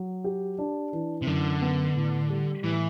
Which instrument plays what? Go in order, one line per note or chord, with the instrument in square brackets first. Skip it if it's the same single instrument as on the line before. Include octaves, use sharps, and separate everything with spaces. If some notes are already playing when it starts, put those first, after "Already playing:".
Already playing: [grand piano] F#3
G4
D4
E3
[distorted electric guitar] C3
[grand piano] F#2 [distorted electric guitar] D3
[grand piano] B3
A2
G3
[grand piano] A2 [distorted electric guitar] E3